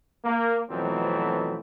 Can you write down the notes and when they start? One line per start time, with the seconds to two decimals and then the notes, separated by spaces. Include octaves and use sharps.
0.24 A#3
0.70 F2 B2 E3 F#3 A3 C4